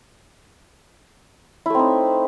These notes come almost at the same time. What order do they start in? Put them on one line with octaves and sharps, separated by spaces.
E4 A3 C4 D#4